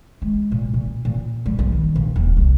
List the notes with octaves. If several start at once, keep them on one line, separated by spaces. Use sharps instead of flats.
G#3
A#2
A#2
A#2
G3
A#1
D#3
A#2
D#1
C2